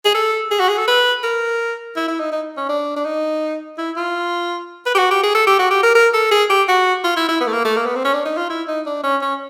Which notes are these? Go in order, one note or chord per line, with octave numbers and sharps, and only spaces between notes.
G#4
A4
G#4
F#4
G#4
A4
B4
A#4
E4
E4
D#4
D#4
C#4
D4
D4
D#4
E4
F4
B4
G4
F#4
G4
G#4
A4
G4
F#4
G4
A#4
A#4
A4
G#4
G4
F#4
F4
E4
E4
B3
A3
A#3
A3
A#3
B3
C4
C#4
D4
D#4
F4
E4
D#4
D4
C#4
C#4